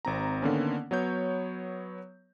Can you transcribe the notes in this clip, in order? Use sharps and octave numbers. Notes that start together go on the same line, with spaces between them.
G#1 C4 A#5
D3 D#3 A#3 B3 C#4
F#3 B3 C#5 G6